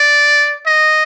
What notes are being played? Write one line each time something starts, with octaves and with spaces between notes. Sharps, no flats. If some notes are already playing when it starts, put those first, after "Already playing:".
Already playing: D5
D#5